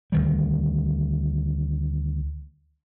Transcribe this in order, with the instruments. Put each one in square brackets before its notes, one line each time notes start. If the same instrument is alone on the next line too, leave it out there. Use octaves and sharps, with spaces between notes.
[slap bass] D2 D#3 G3